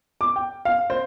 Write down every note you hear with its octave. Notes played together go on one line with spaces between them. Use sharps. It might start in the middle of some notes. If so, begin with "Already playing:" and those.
D6
G5
F5
C5